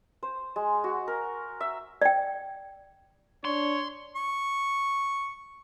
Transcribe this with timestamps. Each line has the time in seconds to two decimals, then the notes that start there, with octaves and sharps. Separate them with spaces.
0.23 C5
0.56 G#3
0.84 F#4
1.08 A#4
1.60 E5
2.02 D5 G5
3.45 D4 C#5 C6
4.16 C#6